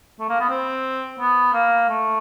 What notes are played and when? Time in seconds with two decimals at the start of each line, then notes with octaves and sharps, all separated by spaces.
0.20 A3
0.29 A#3
0.40 B3
0.49 C4
1.20 B3
1.53 A#3
1.89 A3